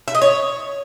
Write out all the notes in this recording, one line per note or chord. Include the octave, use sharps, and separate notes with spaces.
E5
D#5
C#5